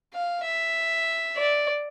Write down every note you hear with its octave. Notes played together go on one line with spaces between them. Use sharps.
F5
E5
D5